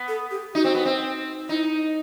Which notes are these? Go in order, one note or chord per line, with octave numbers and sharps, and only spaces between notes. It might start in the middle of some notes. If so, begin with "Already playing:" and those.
Already playing: B3
A4
G4
D#4 F#4
C4
B3
C4
D#4 E4